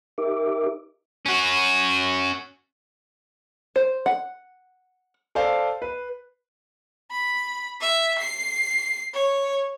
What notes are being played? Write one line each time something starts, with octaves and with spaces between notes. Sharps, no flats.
D#4 G4 A#4 E5 D6
C#4 F#4
C5
F#5
A4 C5 D5 F5 A5
B4
B5
E5
C7
C#5